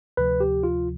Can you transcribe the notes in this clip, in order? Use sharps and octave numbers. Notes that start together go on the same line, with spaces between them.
D2 C3 F3 B4
G4
F4